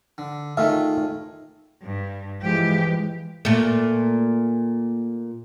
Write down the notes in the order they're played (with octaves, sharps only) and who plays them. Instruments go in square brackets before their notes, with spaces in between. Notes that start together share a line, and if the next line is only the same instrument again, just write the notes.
[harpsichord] D3
[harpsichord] D#3 G#3 F4 [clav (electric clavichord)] A3 D#5 E5
[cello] G2
[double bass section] E3 F3 G#3 [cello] G4
[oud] A#2 A3